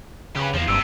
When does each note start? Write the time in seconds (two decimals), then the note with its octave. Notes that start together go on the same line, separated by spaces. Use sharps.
0.36 C#3 G4 B4
0.54 E2 F3 A#3
0.68 F#1 G2 C3 E6